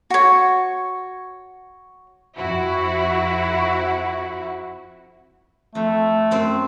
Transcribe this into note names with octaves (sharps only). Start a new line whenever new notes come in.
F#4 C#5
F2 E4 F#4
F2 A3
F#2 C4